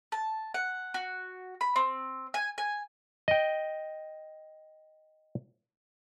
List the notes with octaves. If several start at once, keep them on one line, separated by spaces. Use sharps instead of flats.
A5
F#5
F#4
B5
C4
G#5
G#5
D#5 G5